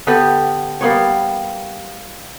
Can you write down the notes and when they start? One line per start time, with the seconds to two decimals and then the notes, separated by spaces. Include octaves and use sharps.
0.07 D3 B3 G4 B4
0.81 G3 A#3 B3 C#5